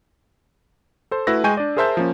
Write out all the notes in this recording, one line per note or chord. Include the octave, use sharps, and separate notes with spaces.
A4 C5
A3 E4 F#4 B4 E6 A#6
G#3 G5 G#5 C#6 G6 D#7
D4 D5
G#4 A#4 C5 E5 A5 G6
F3 A#3 C#4